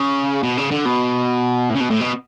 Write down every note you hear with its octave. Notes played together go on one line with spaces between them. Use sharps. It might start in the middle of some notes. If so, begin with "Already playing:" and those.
Already playing: C#3
B2
C#3
D3
B2
A2
C#3
B2
A2
B2